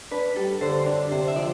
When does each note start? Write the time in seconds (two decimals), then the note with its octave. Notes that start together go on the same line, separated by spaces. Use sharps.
0.11 D4 B4
0.36 G3 A4
0.61 D3 C5
0.86 D4
1.11 C3 C5
1.28 E5
1.36 F3 D5